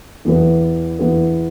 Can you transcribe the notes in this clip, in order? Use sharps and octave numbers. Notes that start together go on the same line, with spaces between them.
E2 E3 B3
E2 E3 B3